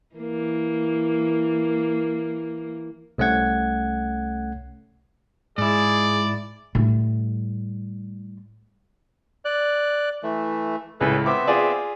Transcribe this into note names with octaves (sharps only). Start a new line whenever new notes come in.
E3 A#3
C2 A3 C#4 F#5 G#6
G#2 E4 G#4 D5
A2 G3
D5 F#6
E3 A3
C#2 A2 G#4 A4 B4
B3 C4 E5 D6
F4 G#4 D5